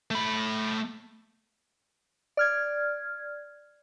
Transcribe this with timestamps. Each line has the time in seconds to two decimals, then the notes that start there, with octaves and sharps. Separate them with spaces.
0.11 A3 B5
2.37 D5 F6 G#6